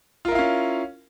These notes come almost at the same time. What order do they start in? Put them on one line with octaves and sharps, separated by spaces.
F4 A#4 E4 F5 C#4